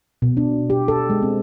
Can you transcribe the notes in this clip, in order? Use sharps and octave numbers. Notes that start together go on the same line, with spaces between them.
B2
D4
G4
A4
G#3
C4